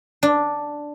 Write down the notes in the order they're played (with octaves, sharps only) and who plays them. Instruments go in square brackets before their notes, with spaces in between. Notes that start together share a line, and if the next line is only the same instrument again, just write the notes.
[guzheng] D4